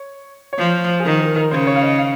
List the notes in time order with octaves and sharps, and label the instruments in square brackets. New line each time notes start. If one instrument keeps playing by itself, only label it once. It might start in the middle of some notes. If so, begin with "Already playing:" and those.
Already playing: [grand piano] C#5
C#5
[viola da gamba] F3 [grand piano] C5
[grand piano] G#4
[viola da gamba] D#3 [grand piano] A#4
[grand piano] A#4
A#4
[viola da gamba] C#3 [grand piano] C5
[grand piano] C#5
F5
D#5
F5